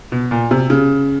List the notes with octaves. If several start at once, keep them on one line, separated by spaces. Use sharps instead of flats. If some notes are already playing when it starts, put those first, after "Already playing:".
B2
A#2
C3
C#3